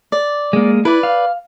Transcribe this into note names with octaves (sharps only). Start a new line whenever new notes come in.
D5
G#3 A#3
E4 B4 D5
F5